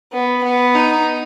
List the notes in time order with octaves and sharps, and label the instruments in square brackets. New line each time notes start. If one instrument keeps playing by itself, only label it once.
[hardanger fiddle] B3
B3
D#4